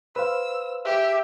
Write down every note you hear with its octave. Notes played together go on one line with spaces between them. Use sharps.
B4 C5 F5 E6
G4 E5